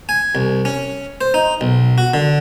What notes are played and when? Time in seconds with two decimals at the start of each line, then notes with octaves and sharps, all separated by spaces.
0.09 G#5
0.35 C2
0.65 C#4
1.21 C5
1.34 D#4
1.61 B1
1.98 F#4
2.14 D3